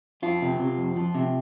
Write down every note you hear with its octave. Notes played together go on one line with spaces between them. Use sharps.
F2 F4
C3
C3
F2
F3
C3